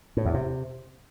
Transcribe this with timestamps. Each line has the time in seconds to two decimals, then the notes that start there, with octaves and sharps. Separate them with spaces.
0.17 A2
0.25 E2
0.34 C3